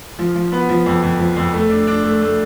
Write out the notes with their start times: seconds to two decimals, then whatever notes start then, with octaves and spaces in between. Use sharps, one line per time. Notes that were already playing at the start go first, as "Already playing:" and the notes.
0.19 F3
0.35 F3
0.52 B3
0.69 F3
0.86 F2
1.03 F2
1.19 F3
1.36 F2
1.54 A3
1.70 D4
1.87 D4
2.04 A3
2.21 A3